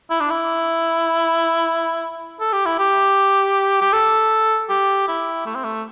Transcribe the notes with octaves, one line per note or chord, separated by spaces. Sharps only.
E4
D4
E4
A4
G4
E4
G4
G4
A4
G4
E4
A3
C4
A3